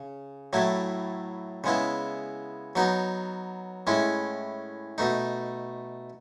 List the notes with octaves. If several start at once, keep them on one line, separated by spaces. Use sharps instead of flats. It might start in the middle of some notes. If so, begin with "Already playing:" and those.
Already playing: C#3
A2 F#3 A3 E4
C#3 G#3 B3 E4
F#3 B3 D#4
A2 G#3 C#4 E4
B2 A3 D#4